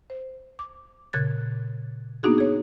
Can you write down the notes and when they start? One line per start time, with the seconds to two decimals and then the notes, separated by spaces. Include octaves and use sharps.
0.10 C5
0.59 D6
1.13 A#2 C#3 F#6 G#6 A6
2.23 A#3 B3 D4 D#4 F#4 G#4
2.38 G#4 C#5